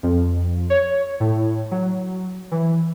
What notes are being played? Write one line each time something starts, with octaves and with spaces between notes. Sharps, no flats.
F2
C#5
A2
F#3
E3